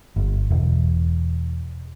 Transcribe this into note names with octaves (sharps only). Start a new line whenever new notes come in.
G1
E1